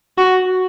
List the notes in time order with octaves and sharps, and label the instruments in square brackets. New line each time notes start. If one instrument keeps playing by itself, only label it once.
[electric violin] F#4